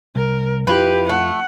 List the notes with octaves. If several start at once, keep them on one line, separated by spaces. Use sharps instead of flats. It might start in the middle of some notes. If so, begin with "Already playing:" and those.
C2 A#4
F2 E4 F4 G4 B4
A3 F#5